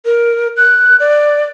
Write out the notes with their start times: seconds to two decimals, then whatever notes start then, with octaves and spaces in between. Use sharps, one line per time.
0.05 A#4
0.57 F#6
1.00 D5